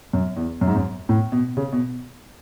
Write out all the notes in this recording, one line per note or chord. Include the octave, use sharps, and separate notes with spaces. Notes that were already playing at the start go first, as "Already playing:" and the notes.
F#2
E2
F#2
G#2
F#2
A2
B2
C#3
B2